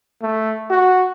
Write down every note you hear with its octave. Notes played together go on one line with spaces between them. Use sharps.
A3
F#4